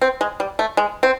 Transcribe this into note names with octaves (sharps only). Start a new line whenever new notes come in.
C4
G#3
G3
A3
G#3
C4